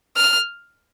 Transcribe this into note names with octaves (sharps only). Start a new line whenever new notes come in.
F6